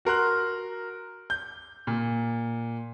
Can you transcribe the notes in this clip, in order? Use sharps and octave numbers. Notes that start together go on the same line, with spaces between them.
F#4 A#4 C6 F#6
G6
A#2